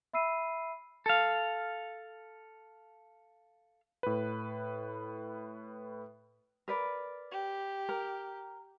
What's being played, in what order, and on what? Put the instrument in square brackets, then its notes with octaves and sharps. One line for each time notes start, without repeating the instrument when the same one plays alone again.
[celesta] E5 B5 E6 C7 D#7
[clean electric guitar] A4 F5
[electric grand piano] A2 B4
[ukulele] A#4 B4 D5
[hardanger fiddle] G4
[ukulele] A#4